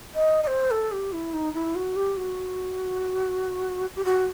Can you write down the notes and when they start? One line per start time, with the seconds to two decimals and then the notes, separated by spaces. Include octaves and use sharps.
0.15 D#5
0.43 D#5
0.47 C5
0.71 A4
0.92 G4
1.12 E4
1.34 D#4
1.54 E4
1.75 F#4
1.96 G4
2.17 F#4
3.96 G4
4.05 F#4